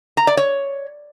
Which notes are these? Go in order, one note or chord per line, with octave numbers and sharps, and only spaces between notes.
A#5
D5
C#5